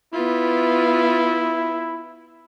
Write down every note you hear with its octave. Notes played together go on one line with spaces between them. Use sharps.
B3 E4 F4